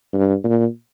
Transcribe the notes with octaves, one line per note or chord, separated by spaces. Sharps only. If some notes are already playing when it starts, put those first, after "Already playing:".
G2
A#2